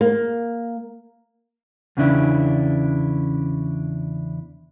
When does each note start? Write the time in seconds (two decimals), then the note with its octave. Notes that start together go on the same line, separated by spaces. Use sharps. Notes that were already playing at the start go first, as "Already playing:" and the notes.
0.01 A#3
1.97 E2 C#3 C#4 D4 E4